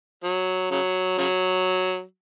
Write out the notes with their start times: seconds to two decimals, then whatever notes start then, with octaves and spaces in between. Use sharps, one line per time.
0.24 F#3
0.71 C#3 F#3
1.18 C#3 F#3